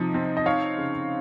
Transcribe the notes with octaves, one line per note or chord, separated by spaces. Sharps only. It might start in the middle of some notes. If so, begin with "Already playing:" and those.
Already playing: C3 F3 D#4 D#5
C4
D#5
D#4 C#5 F5
C#3